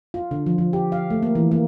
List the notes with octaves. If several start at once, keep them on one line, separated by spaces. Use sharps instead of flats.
F4
D3
F3
F3
G4
F5
A3
A#3
E3
A#3